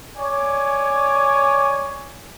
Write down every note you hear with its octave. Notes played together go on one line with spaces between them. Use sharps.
C#5 D5 G#5 D6